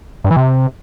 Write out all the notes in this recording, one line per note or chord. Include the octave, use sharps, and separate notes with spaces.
G2
E3
C3